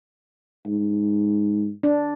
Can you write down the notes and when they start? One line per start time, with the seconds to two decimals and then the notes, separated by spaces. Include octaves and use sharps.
0.66 G#2
1.83 D4